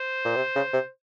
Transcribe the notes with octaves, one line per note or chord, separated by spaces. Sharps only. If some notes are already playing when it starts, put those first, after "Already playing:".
Already playing: C5
A#2
C3
C#3
C3